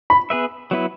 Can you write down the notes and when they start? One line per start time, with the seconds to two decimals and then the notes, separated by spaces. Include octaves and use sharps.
0.10 B5
0.30 B3 G#4 B4 E5
0.71 F#3 B3 E4 B4